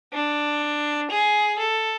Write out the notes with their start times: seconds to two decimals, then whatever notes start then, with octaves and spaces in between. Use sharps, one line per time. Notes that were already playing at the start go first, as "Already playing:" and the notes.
0.13 D4
1.10 G#4
1.59 A4